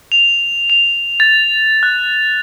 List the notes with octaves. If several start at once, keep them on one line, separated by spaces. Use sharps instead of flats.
F7
F7
A6
F#6